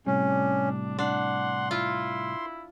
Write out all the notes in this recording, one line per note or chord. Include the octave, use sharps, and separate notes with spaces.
A2 C3 G3 C#4
D4
D4 F#5 C6
E4 F4